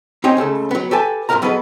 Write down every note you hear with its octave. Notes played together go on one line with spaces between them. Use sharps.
C4 D#4 G4 C#5 G#5
C#2 C#3 A3 A4
F#3 B3
G4 A4 B4 G#5 A5
F#2 A#2 D4 A#4 F5 A#5
F#3 B3 G#4 A4 B4 D#5